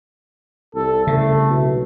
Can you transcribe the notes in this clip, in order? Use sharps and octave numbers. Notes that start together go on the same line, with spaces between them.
C2 A4
C#3 A3
B1